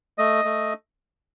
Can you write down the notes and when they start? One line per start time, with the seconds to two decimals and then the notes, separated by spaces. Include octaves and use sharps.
0.18 A3 D#5
0.45 A3